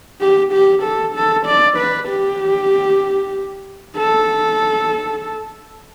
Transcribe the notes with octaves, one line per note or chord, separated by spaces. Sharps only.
G4
G4
A4
A4
D5
B4
G4
A4